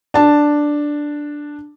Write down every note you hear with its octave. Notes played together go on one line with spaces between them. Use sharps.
D4 A5